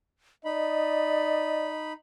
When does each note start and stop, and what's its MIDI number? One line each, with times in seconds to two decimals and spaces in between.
0.45 1.92 63
0.45 1.70 74
0.45 1.85 75
0.45 1.92 83